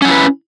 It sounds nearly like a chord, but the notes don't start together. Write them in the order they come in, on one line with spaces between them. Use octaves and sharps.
C#4 F#5 E4 B4